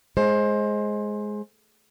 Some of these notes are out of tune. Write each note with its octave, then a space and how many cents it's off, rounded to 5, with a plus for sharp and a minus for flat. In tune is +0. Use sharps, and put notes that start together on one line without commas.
G#3 +10 C5 +20